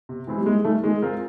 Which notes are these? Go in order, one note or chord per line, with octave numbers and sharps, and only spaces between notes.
C3
E3 G#3 C4 E4
G3
G#2 G#3
D#3 G3 A3
D#3 G#3
G#3 C4 F4 A#4